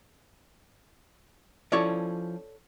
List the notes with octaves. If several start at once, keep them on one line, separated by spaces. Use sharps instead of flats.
F3 C#4 E4 A4 C#5 D5